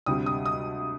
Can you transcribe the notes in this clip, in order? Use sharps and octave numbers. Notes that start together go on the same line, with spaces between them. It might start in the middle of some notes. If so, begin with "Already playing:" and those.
D2 C3 G3 D#6
D#6
D#6